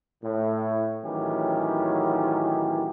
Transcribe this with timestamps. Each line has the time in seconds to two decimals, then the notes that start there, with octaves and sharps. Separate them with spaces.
0.24 A2
1.04 A2 D#3 E3 F#3 C#4 G4